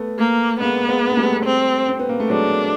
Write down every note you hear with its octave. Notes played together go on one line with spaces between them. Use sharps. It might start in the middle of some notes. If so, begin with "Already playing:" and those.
Already playing: A3 B3
A#3
G#3 A#3 B3
G#3 A#3
A#3
G3 A3
C4
C4
B3
A#3
A3
F#3 G#3 D4